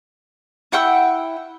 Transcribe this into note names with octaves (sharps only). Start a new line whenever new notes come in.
E4 F#5 G5 E6